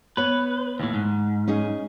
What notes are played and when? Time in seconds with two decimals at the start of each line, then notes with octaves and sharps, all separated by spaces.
0.17 B3 B4 C#5
0.80 D#2 A2
0.94 G#2
1.47 C#4 D#4 G#4